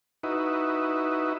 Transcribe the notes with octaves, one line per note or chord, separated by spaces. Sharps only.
D#4 E4 F#4 B4